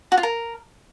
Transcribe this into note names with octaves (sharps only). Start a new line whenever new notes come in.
F#4
F4
A#4